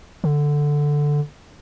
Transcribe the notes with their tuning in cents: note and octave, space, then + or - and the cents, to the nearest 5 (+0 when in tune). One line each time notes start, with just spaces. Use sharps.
D3 +0